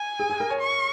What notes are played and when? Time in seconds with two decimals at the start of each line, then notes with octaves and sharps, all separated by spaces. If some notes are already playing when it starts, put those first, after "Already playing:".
Already playing: G#5
0.20 G#4
0.30 G#4
0.40 A#4
0.50 C#5
0.61 C#6